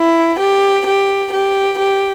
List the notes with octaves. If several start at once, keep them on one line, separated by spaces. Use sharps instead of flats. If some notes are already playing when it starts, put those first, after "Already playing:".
Already playing: E4
G4
G4
G4
G4